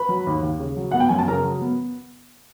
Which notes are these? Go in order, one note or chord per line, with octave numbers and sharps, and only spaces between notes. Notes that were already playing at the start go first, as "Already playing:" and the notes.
Already playing: B4 B5
F#3
D#2
D#2
C#3
F#3
B3 F#5
G5
F#2 G#5
A5
C#3 A#4 A#5
F#3
B3